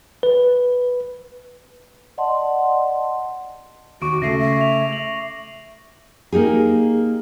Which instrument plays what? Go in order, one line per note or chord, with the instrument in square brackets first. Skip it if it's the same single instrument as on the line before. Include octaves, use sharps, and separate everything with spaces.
[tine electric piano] B4
[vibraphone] D5 D#5 F#5 A5 C6
[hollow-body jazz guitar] D#2 [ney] F#4 [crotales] C#6 D6 D7
[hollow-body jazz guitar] C#3 A3 [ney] E5 [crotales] A#6 C7 D#7
[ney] E5
[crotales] F7
F#7
[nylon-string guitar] A#3 D#4 G4 G#4